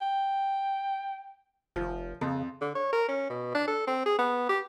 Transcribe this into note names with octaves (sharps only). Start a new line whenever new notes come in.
G5
F1 F3
F2 C#3
D3
C#5
A#4
C#4
B2
D4
A4
C4
G#4
B3
G4